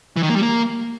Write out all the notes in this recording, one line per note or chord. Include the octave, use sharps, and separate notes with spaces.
E3
D#3
A#3
G3
A#3